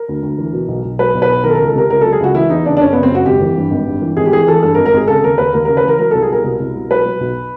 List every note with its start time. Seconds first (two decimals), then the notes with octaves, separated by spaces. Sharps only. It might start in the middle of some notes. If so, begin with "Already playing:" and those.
Already playing: A#4
0.08 D2
0.23 D2
0.38 E3
0.53 B2
0.68 B1
0.84 B1
0.99 F#3 B4
1.15 B1
1.22 B4
1.29 B1
1.44 D#3 A#4
1.50 A4
1.55 C#2 A#4
1.67 A4
1.75 C3 A#4
1.90 C#2 A#4
2.01 F#3 A4
2.12 G#4
2.20 C#2 F#4
2.35 E3 E4
2.50 E2 D#4
2.66 C#3 D4
2.77 D4
2.81 F#1 C#4
2.93 C#3 B3
3.03 C4
3.11 F#1 F#4
3.26 G#1 G4
3.41 E3
3.57 G2
3.71 G#1
3.87 G2
4.02 E3
4.17 G#1 G#4
4.26 G4
4.32 E3 G#4
4.47 E3 A4
4.63 G2 A4
4.75 A#4
4.77 G#1
4.86 A#4
4.93 G#1 G#4
5.08 C#3 A4
5.24 D#2 A#4
5.38 D#2 B4
5.54 D#2 A#4
5.65 C#3 A#4
5.77 B4
5.83 E3 A#4
5.99 F#3 A#4
6.11 C2 A4
6.22 G#4
6.30 B2 A#4
6.44 C2
6.60 C2
6.75 B2
6.90 F#3 B4
7.05 F#3
7.20 B1